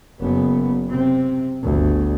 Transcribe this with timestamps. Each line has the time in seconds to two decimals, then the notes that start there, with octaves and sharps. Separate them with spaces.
0.20 F#1 B3
0.89 C3 C4
1.63 G1 D2